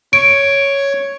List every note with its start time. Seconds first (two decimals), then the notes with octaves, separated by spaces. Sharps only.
0.13 C#5 C#6 D7